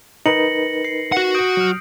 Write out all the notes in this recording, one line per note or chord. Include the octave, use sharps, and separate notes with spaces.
D#4 A#4 B4 A#6 C#7 F#7
C7
F#4 F#5
D#6 G6 D7
F#3 F6